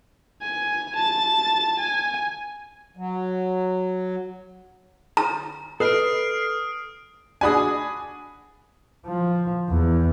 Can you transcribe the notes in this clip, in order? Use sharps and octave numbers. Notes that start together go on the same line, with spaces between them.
G#5
A5 A6
G#5
F#3
A#5
A4 B4 D#5 D#6 F6 C7 D7
D4 F#4 G#4 G#5 B5 D#6
F3
E2